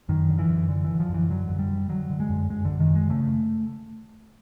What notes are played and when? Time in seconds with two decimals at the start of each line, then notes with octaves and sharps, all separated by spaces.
0.09 F#2 D#3
0.28 D3
0.39 E3
0.49 F#2
0.69 D3
0.84 D3 E3
1.00 F3
1.09 F#2
1.14 E3
1.30 D3 F#3
1.49 F#2
1.59 G3
1.70 D3
1.89 D3 F#3
2.10 D3
2.20 G#3
2.30 F#2
2.50 F#2 G#3
2.65 D3
2.70 F#2
2.80 D#3
2.90 F#2
2.95 G#3
3.10 C#3 A3